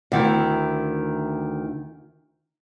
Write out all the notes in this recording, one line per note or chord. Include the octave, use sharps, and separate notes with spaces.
D2 D#3 E4